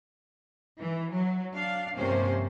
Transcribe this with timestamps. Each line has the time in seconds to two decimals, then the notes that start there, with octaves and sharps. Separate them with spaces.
0.79 E3
1.11 F#3
1.53 D4 F5
1.96 G2 C3 F3 A#3 C#4 C5